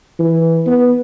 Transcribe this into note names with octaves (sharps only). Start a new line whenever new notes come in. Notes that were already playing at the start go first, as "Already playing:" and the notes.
E3
B3